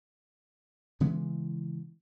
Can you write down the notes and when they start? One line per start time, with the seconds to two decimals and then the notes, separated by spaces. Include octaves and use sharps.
1.00 C#3 E3 G#3 B3